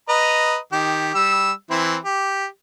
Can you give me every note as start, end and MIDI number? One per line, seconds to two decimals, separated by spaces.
0.09 0.57 71
0.09 0.57 75
0.09 0.57 82
0.72 1.14 51
0.72 1.14 67
1.15 1.52 55
1.15 1.52 88
1.71 1.97 52
1.71 1.97 60
1.71 1.97 64
2.05 2.46 67